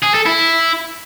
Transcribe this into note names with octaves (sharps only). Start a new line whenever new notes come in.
G#4
A4
E4